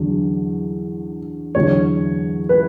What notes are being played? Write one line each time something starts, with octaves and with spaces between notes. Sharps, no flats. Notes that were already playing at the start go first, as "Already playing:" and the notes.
Already playing: E2 D3 F#3
E2 D3 F#3 C#5
B4